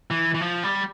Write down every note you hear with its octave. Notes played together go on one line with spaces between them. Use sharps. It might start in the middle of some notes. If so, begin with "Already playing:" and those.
E3
E3
F3
G3